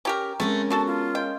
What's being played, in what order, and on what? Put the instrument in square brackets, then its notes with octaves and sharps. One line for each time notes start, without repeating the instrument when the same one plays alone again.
[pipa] C#4 G4 A#4 [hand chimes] G5 A#5
[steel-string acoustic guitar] G#3 C#4 A#4 [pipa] A3 [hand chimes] C4 G#5 [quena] C#6
[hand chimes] B3 [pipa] D4 F#4 A4 [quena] A5
[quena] F4
[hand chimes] D#5 F5 C6 [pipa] G5